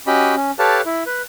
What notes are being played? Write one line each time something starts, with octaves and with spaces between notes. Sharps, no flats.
C#4 F#4 G4 D#5 B5
C#4
G4 A4 B4 C#5 F5 A5
E4
B4